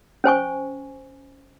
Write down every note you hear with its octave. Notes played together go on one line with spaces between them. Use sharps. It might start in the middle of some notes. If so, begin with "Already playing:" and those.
C#4 C5 G#5 C#6